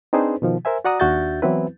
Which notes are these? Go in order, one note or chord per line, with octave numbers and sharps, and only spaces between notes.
C4 D4 D#4 G#4 B4 C5
B2 D#3 F3
A#4 C5 E5 G#5
F#4 D5 F#5 A#5 D#6
D#2 D4 F#4 E5 G6 A6
E3 F#3 B3 C4 E4 B4